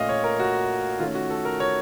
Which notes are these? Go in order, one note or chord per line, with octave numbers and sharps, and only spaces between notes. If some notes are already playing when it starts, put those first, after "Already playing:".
Already playing: A#2 A3 C#4 D#5 F5
C#5
A#4
F#4
D#3 A3 C#4 F4
F#4
A4
A#4
C#5